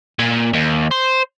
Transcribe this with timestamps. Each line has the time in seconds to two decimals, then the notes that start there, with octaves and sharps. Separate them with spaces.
0.19 A#2
0.53 D#2
0.91 C5